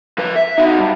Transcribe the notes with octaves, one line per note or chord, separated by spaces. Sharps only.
F3 B4
E5
D#4 F#4
G2